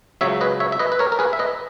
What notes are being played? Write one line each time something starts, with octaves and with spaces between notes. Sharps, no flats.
C#2 C#3 F#3 C#5 E5
B4 D#5
C#5 E5
E5
B4 D#5
B4
A#4 C#5
A#4
G#4 B4
E5
B4 D#5